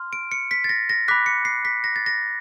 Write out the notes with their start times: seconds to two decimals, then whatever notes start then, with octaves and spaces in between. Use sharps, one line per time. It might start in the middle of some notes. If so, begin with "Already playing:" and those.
Already playing: C6 F6
0.13 D7
0.32 C#7
0.51 B6
0.64 A6
0.69 A#6
0.89 A#6
1.08 B5 D6 F#6 B6
1.26 C#7
1.45 C7
1.65 B6
1.84 A#6
1.96 A6
2.06 A#6